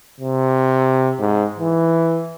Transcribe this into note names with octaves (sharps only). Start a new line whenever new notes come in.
C3
G#2
E3